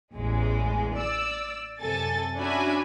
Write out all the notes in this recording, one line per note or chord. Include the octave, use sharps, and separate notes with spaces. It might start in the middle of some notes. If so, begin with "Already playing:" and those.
A1 E2 G#3
D5 E6
F#2 C3 A4 G#5 A6
C#4 D4 F#4 E5 G#5 B5